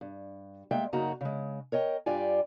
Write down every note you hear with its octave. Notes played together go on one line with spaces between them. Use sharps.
G2
G3 G#3 A#3 E5 G5
F#2 C#3 A#3 D#4 F#4 A#5
C#3 G#3
A#4 C#5 D#5 G5
G2 F4 G4 D5 G#5